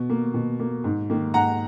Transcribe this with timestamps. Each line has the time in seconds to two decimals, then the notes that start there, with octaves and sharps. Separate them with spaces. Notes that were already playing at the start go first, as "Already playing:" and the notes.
Already playing: B2
0.10 A#3
0.34 B2
0.60 A#3
0.84 G#2
1.10 D#3 A#3
1.34 G#2 F#5 A#5